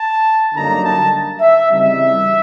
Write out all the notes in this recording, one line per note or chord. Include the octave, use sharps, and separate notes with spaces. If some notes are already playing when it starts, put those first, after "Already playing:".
Already playing: A5
F#2 D3 G3 A#3 D#4 A#5
A5
E5
C#3 E3 G3 C4 D#4 E5